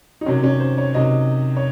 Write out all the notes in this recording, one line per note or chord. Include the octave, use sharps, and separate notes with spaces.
D#4
C3 D#3 F#3 C#4
C#4
C5
C#5
C3 D#3 F#3 D#5
C#5